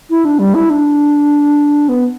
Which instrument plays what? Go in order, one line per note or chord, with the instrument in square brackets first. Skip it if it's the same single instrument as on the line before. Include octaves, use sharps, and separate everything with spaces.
[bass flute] E4
D4
G3
E4
D4
B3